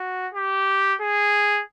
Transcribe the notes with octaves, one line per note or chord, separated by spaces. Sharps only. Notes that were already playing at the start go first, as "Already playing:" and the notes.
Already playing: F#4
G4
G#4